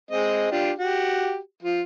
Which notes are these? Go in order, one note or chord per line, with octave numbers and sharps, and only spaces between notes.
G#3 C4 D#5
D4 F4 G4
F#4 G4
F3 F4